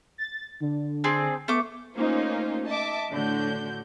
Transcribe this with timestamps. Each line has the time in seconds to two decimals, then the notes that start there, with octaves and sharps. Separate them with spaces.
0.18 A6
0.60 D3
1.04 C4 D4 G#4
1.48 A3 B3 D6
1.96 A3 A#3 C#4 D#4 F4 C5
2.66 D#5 E5 A5 D6
3.10 A2 D3 A3 D4 F#4 G6